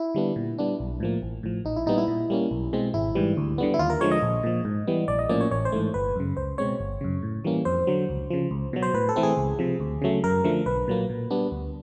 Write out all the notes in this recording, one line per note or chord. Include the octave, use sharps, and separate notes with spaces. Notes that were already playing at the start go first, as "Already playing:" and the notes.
Already playing: E4
D3 G3 B3 D4
A#2
G3 B3 D4
B1
A2 F3 A#3
A1
A2 F3
A#1 D#4
E4
A#2 G3 B3 D#4
E4
A#2
G3 A#3 C#4
B1
B2 G#3 C4
G#1 E4
G#2 E3 G3
D2
D3 G3 B3
E4
D#2 F4
A#4
D3 F3 G#3 C#5
D#5
A#1
A#2 F3
G#2
E3 G3 B3
A#1 D5
D#5
A2 F3 A#3 C#4 D5
C#5
A1 C#5
C5
G#2 E3 A3
G1 B4
F#2 C#3
C#2 C5
B2 G#3 C4 C#5
G1
F#2 C#3
A2
E3 G3 A#3 C#4
F2 C5
D3 F#3
C#2
C#3 F3
C#2
B2 F#3
C5
A2 B4
A4
E3 A3 C4
G#4
C#2
C3 F3
D2
C#3 F#3 A3
F#2 A#4
D3 F3 A3
B1 B4
A#2 F#3 A#3
A#2
G3 B3 D4
D2